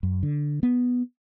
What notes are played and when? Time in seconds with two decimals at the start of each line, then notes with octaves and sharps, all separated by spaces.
0.03 F#2
0.23 D3
0.63 B3